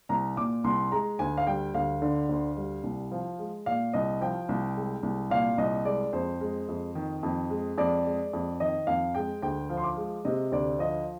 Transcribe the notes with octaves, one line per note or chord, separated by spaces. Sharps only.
C2 A#5
A#2 D6
C2 C6
G#3 A#5
D2 G#5
F5
G3 G5
D2 F5
D3
D2
G3
C2
F3
G#3
A#2 F5
C2 D#5
F3 G5
C2
G#3
C2
A#2 F5
C2 D#5
G#3 D5
F2 C5
G#3
F2
D#3
F2
G#3
F2 D5
G#3
F2
D#3 D#5
F2 F5
G#3 G5
D2 G5
F3
C6
D6
G#3
C3 D#5
D2 D5
F3 D#5